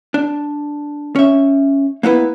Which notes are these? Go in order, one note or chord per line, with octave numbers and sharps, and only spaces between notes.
D4
C#4 E5
A#3 B3 E4 B4